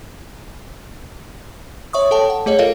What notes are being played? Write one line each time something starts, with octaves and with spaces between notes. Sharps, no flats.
C#5 E5 C#6 D#6
A4 C#5 G5 A5
F#5
A3 G#4 C#5 D#5
F4 A4 A#4 D#5 F5